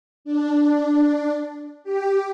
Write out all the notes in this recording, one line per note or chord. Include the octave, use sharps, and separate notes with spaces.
D4
G4